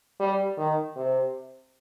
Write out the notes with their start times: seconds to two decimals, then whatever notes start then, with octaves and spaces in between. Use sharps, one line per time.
0.20 G3
0.58 D#3
0.96 C3